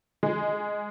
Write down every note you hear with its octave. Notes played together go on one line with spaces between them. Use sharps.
G#3